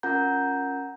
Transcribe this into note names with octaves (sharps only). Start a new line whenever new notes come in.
C#4 F4 A#4 F#5 A#5 G6